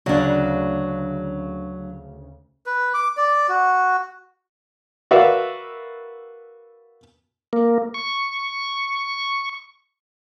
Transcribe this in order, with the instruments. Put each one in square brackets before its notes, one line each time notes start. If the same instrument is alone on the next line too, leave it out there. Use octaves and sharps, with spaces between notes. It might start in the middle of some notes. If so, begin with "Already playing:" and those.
[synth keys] D2 C#3 [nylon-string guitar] F#3 D4
[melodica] B4
D6
D5
F#4
[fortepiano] F#4 A#4 B4 D5 E5 F5
[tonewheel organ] A#3
C#6